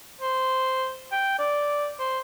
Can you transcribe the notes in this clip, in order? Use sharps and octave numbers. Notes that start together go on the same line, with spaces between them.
C5
G5
D5
C5